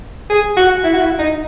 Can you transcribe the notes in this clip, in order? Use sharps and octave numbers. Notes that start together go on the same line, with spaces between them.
G#4
F#4
E4
F#4
E4
D#4